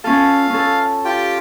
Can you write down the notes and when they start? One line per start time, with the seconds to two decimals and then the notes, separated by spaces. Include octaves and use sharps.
0.04 C#4 F4 A4 F5
0.50 C#4 A4
1.05 F4 G4 G5